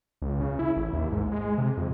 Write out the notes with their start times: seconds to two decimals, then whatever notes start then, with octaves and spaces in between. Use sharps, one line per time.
0.22 C#2
0.41 C#3
0.59 E4
0.77 A1
0.93 D#2
1.12 G#2
1.32 G#3
1.58 C3
1.77 F2